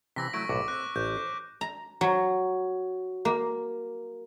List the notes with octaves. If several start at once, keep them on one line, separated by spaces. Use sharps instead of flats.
C3 E3 C4 E6 A#6 B6
F#3 A3 E4 C#6 D7
B1 A2 F#4 D6
C4 F#6
A1 G6
C5
A#5
F#3
A#3